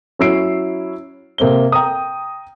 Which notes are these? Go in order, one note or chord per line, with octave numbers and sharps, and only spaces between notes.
F#3 C#4 E4 E6 C7 D7
C3 A#3 C4 G7
G5 A#5 D#6